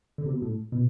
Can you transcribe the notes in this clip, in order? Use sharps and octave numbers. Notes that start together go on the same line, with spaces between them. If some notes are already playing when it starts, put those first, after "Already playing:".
D3
C3
B2
A2
B2